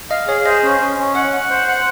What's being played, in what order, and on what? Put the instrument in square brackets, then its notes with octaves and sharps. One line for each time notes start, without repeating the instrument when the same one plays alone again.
[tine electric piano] D#5 [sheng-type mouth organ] F5
[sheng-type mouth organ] G#4 [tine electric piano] C#5
[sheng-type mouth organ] C5 [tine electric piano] D#5
[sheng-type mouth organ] C#4
C#4
C#4
[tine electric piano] C#5 [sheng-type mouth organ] F#5
[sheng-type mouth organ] F#5
C5
F#5